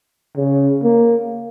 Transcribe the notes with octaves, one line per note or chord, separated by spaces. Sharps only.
C#3
A#3